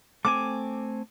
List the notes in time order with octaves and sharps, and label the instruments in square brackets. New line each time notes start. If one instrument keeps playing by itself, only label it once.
[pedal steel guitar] A3 C4 G#5 [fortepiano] D6